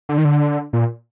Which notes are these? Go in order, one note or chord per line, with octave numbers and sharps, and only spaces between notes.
D3
D#3
D3
A#2